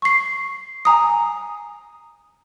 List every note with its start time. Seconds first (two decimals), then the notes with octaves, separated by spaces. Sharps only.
0.02 C#6 C7
0.85 G#5 A#5 D#6